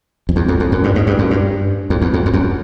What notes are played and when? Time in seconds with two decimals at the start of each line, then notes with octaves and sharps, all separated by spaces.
0.29 F2
0.36 E2
0.48 F2
0.60 F2
0.72 F#2
0.84 G2
0.96 G#2
1.07 G2
1.19 F#2
1.31 G2
1.90 F2
2.02 E2
2.14 F2
2.26 F2
2.34 F#2